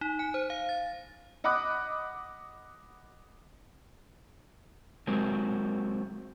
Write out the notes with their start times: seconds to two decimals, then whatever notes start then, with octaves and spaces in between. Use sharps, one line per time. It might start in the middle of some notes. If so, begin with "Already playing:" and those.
0.01 D#4
0.19 G#5
0.34 C5
0.50 F5
0.69 A6
1.44 D#5 F#5 B5 D6 D#6 F#6
5.07 F#3 G#3 C4 A#4